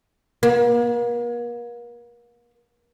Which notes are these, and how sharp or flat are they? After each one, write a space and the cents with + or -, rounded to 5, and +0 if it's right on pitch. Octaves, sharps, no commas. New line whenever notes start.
A#3 +40